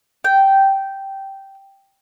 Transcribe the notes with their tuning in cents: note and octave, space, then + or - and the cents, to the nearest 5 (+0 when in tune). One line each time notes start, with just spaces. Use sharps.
G5 -10